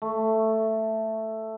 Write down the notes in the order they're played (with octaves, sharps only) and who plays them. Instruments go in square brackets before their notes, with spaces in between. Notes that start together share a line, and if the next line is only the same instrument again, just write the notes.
[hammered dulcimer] A3